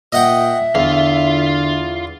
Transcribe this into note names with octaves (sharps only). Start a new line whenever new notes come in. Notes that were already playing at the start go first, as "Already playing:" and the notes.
A#2 D#5 E5 F#5 G5
E2 D3 F4 F5